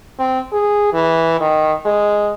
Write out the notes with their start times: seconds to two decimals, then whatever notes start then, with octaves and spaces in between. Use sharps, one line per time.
0.19 C4
0.52 G#4
0.93 E3
1.40 D#3
1.85 G#3